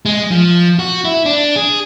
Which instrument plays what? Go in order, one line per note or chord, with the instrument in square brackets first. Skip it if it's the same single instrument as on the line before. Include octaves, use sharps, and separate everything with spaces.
[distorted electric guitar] G#3
F3
F#4
E4
D4
G#4